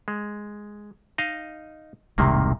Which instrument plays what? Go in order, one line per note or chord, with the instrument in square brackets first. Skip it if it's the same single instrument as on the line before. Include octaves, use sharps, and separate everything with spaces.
[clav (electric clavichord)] G#3
D#4 D#5 F5
[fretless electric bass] E1 C2 G#2 [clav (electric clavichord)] C3 D#3 A#3